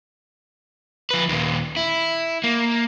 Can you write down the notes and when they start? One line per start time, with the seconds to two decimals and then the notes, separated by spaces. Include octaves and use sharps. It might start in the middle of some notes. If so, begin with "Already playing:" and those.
1.11 F3 B4
1.29 D#2 A#2
1.76 E4
2.44 A#3